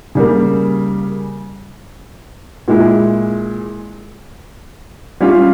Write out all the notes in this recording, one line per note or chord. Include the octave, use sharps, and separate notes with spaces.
C#3 G3 A#3
A#2 G#3 E4
G3 C#4 F4